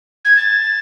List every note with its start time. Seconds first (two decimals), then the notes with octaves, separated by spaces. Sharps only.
0.24 G#6
0.36 A6